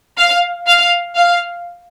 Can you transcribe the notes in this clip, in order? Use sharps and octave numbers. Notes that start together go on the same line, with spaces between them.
F5
F5
F5